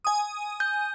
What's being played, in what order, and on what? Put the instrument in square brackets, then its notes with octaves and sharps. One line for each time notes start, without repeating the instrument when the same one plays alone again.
[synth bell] G#5 D#6
[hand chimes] G6